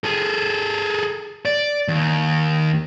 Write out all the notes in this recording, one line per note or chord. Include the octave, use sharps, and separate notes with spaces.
G#4 A4
D5
D#2